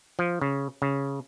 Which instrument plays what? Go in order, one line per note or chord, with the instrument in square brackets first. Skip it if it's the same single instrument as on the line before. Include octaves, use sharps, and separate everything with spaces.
[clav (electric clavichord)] F3
C#3
C#3